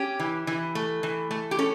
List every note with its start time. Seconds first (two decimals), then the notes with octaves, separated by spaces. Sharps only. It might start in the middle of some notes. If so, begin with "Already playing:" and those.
Already playing: C#4 G4
0.20 E3
0.47 E3
0.75 A3
1.03 E3
1.31 A3
1.51 G4
1.59 C#4 A4